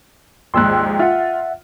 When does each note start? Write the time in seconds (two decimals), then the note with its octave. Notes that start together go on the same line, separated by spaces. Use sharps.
0.54 A#1 D#2 G#2 C6 E6 F#6
0.99 F4 E5 F#5